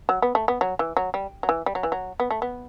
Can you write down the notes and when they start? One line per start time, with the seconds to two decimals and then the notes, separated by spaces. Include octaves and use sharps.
0.09 F#3
0.22 B3
0.35 A3
0.48 B3
0.61 F#3
0.79 E3
0.97 F#3
1.14 G3
1.43 F#3
1.49 E3
1.66 G3
1.75 F#3
1.83 E3
1.92 F#3
2.20 B3
2.31 A3
2.42 B3